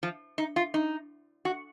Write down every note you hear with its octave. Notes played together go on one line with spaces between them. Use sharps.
F3
D#4
F4
D#4
F#4